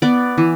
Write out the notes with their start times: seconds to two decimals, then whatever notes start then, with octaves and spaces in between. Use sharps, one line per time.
0.02 B3 D5
0.38 E3